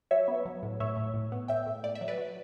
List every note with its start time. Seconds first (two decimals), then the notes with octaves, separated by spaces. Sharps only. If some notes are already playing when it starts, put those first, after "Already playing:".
0.11 F#3 C#5 E5
0.28 B3
0.45 F#3
0.63 A2
0.80 A2 C#5 E5
0.97 A2
1.14 A2
1.32 B3
1.48 A2 E5 G5
1.67 A2
1.84 A2 D5
1.95 E5
2.01 F#3
2.08 B4 D5
2.18 F#3